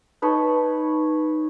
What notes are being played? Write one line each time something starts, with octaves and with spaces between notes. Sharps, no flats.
D#4 B4 C#5 A5